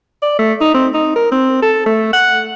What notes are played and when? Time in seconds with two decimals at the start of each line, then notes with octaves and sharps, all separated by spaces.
0.23 D5
0.39 A3
0.61 D#4
0.75 C4
0.94 D#4
1.16 A#4
1.32 C4
1.62 A4
1.86 A3
2.13 F#5